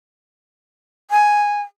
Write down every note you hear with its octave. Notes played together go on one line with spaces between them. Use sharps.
G#5